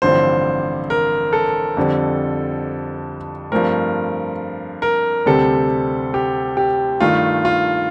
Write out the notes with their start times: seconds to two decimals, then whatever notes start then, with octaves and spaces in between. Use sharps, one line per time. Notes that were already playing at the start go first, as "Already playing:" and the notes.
0.02 A1 G2 D3 F3 C4 C5
0.90 A#4
1.33 A4
1.77 F2 D3 G3 C4
3.52 G2 F3 A3 C4 A#4
4.82 A#4
5.26 D2 C3 G3 C4 A4
6.14 G4
6.57 G4
7.00 G2 D#3 A3 F4
7.45 F4